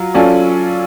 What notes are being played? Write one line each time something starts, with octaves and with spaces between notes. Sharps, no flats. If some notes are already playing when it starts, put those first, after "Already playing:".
Already playing: F#3 F4
F#3 C#4 F4 A4 D5